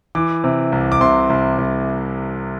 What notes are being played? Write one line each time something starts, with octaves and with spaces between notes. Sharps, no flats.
E3 D6
C3
C2
D6
C3 C6
C2
C2